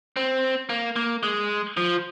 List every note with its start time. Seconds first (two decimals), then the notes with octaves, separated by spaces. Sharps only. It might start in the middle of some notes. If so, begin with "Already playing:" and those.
0.17 C4
0.70 A#3
0.96 A#3
1.23 G#3
1.77 F3